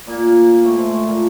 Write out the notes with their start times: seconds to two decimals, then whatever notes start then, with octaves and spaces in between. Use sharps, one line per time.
0.07 A#2 A#3
0.64 A2 A3
0.77 G#2 G#3
0.92 A2 A3
1.05 A#2 A#3